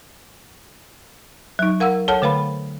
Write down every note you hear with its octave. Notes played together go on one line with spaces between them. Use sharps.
F#3 D#4
A#4 F5 F#5 E6
A4 C#5 F#5 A5 F6
D3 A3 B4 F5 B5